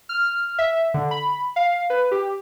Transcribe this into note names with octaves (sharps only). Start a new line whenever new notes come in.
F6
E5
D3
B5
F5
B4
G4